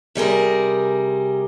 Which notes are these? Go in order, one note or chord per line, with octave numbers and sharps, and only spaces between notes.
C3 G3 G#4 A#4